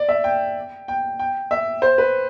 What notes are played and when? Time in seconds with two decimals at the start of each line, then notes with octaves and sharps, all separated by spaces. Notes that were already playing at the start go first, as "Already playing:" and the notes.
Already playing: D5
0.09 E5
0.24 G5
0.88 G5
1.19 G5
1.51 E5
1.82 C5
1.98 B4